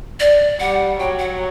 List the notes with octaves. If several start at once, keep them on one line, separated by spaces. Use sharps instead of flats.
D5
G3 F#5
F#3 G5
F#5